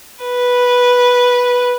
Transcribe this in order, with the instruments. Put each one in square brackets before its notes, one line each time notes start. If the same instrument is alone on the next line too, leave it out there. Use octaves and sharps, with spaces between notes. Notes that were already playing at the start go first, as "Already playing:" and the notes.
[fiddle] B4